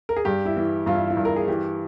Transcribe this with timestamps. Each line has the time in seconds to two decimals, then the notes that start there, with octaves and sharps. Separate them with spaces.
0.09 A#4
0.17 G#4
0.25 G2 G4
0.45 E4
0.57 E3
0.86 G2 F4
0.94 E4
1.10 E4
1.17 G2
1.25 A#4
1.36 G#4
1.48 E3 G4